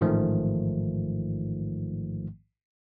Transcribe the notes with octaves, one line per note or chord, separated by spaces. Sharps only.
A1 G#2 D#3 F3 A3